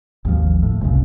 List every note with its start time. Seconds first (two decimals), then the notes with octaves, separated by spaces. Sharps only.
0.25 G#1 D#2 F3
0.63 A2
0.81 G1 C2 F2 C#3